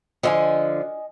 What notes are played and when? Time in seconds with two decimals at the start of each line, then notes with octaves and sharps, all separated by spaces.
0.23 D3 F3 D#5 E5 G#5